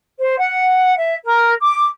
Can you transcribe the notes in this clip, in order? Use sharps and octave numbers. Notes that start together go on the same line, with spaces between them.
C5
F#5
E5
A#4
D6